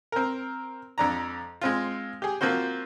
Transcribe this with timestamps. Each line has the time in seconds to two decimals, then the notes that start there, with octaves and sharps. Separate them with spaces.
0.12 C4 A#4
0.98 F2 D4 A#5
1.61 G#3 C4 F4
2.22 G4 G#4
2.41 F3 A#3 C4 F#4 C5